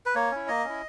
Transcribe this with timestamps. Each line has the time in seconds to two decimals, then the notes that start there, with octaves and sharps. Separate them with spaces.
0.06 B4
0.15 A#3 C#5
0.32 C#4 E4
0.48 A#3 D#5
0.65 C#4 E4